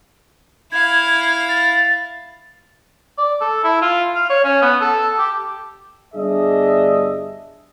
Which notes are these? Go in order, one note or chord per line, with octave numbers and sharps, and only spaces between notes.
E4 F5 G#6
A6
D5
A4
E4
F4
F5
C#5
C#4
B3
A4
G4
G1 G2 D4 G#4 D#5 E5